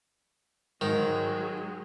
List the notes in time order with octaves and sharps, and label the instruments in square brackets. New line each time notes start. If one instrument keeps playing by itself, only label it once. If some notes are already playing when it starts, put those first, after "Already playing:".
[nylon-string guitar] G#2 [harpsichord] D#3 [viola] F#3 G#3